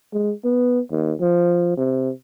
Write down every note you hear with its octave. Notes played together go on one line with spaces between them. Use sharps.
G#3
B3
D#2
F3
C3